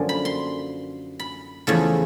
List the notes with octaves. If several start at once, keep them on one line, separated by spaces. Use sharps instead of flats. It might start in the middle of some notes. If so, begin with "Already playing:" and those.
Already playing: F#2 D3 F3 A#3 G#5
B5
C6
B5
E2 C#3 F3 A3